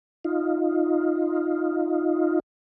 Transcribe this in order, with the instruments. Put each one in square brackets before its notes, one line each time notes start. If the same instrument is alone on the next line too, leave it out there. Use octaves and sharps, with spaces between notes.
[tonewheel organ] D#4 F4